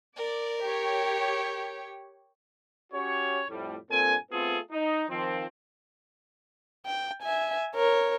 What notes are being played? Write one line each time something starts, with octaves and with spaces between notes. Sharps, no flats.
A#4 D5
G4 C#5
C#4 F#4 G4 C#5
F2 A2 G3
G2 A#2 C4 A4 G#5
A3 B3 C4 F4 G#4 A4
D#4
D#3 F3 C4
G5
E5 G#5
A#4 C#5